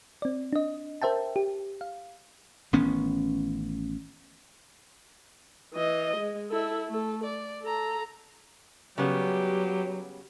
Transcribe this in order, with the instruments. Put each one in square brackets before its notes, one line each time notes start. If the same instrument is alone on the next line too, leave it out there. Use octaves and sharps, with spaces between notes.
[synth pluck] C4 D5
D4 D#5
A#4 C5 E5 G5 A5
G4
F5
[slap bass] A1 D#3 B3 C#4
[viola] E3 D#5
G#3
E4 A4
A3 A4
D5
A4 A#5
[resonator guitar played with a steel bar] C#3 G3 B3 [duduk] F#3 [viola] G4